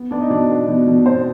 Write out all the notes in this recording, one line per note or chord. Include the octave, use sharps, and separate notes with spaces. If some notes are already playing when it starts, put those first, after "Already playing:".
Already playing: B3
B3 D4 D5
D#4 D#5
B2 D4 D5
B3
B2
B2
B2 C4 C5